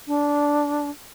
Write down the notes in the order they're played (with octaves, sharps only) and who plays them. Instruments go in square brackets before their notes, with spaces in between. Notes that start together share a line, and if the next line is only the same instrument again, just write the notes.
[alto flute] D4